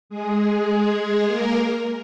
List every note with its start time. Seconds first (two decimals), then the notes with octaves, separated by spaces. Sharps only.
0.09 G#3 G#4
0.97 G#3 G#4
1.26 A#3 A#4